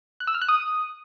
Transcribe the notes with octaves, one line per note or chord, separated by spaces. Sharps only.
F#6
E6
F6
F#6
D#6